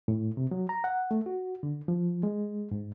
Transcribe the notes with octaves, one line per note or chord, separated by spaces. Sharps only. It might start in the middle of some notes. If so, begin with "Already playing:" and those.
A2
C3
F#3
A#5
F#5
A3
F#4
D3
F3
G#3
G#2